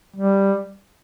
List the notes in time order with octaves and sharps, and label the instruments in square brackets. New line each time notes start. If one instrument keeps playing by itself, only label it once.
[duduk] G3